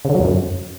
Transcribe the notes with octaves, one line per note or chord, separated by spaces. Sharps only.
C#3
D3
F#3
E2
F#2